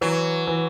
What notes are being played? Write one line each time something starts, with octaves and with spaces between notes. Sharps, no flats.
E3 F#3
E3